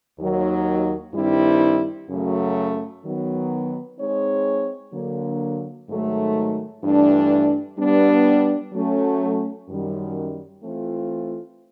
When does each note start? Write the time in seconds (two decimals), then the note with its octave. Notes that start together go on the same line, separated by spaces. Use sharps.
0.19 D#2 D#3 F#3
1.13 G2 D#3 G3 C4 E4
2.08 F#2 C#3 F#3 A3
3.04 D#3 F#3 B3
3.99 G#3 C4 D#4 G#4 C#5
4.93 D3 F#3 A#3
5.88 G#2 D#3 F#3 A3
6.84 G2 E3 A3 D4
7.78 G3 B3 D4
8.73 F#3 A3 C#4
9.69 F#2 D#3 G3
10.63 E3 A3 C4 F4